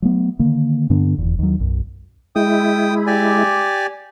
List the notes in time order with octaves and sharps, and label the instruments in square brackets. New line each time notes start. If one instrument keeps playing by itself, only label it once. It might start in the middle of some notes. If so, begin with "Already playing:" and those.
[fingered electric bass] F#3 A3 B3
D3 D#3 A#3
G2 D3 B3 D4
F1 E2
D#2 F#3
B1 F#2
[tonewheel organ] G#3 E4 [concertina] G5 D#6
[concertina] G4 D5 G#5